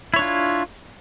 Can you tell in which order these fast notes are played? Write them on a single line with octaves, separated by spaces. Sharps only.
E4 C#5 D4 F4